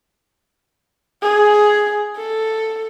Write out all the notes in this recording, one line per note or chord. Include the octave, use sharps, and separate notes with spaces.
G#4
A4